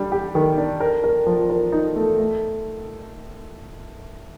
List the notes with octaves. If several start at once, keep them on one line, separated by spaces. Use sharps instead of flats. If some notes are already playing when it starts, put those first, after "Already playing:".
Already playing: G3 D4
G4
D#3
D4
A#4
A#4
F3
A#4
D#4
A3
A3